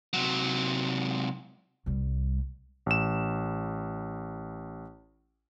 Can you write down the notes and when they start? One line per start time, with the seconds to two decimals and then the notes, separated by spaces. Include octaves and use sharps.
0.13 C3 F#3
1.86 C2 G3
2.86 A1 E7